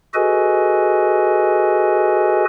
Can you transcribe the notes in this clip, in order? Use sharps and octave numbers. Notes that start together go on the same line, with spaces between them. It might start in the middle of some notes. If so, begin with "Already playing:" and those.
F#4 G#4 A4 B4 D#5 G#5